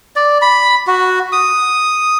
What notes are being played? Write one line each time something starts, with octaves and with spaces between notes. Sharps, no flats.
D5
B5
F#4
D#6